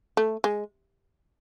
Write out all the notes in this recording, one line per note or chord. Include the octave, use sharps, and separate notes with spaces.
A3
G#3